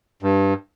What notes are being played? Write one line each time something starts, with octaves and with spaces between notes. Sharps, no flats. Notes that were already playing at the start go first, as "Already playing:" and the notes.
G2